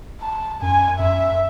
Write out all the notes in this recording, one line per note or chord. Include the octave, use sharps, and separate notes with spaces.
A5
F#2 G#5
F#2 E5